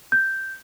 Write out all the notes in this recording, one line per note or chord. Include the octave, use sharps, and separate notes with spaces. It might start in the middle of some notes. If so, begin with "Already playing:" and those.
G6